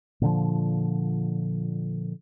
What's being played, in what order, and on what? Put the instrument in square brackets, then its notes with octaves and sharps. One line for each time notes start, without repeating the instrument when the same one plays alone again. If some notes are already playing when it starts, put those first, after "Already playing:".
[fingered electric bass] A#2 D3 F3